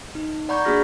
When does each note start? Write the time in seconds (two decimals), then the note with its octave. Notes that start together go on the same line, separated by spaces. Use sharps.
0.15 D#4
0.49 D5 F#5 A#5 B5 C#6 G6
0.65 A#3 D4 F#4 G#4 F6 A#6